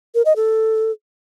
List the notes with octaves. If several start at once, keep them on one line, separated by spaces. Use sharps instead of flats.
A#4
D#5
A4